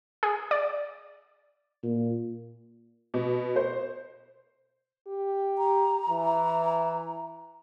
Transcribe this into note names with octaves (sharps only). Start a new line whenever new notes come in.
G#4
D5
A#2
B2
C5
G4
A#5
E3